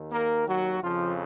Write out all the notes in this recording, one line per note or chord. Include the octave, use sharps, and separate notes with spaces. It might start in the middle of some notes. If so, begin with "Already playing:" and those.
Already playing: D#2 D#3
A#3 A#4
F#3 F#4
F2 C#3 F3 F4